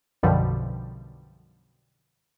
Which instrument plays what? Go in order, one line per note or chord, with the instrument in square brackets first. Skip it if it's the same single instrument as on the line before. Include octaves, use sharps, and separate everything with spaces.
[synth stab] B1 F#2 B2 D3 F3 G3